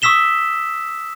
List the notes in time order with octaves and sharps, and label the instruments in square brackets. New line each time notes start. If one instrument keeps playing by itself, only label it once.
[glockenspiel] C#6 D#6 E6 B6 E7 G7